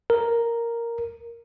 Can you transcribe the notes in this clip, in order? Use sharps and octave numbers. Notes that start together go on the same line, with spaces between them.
A#4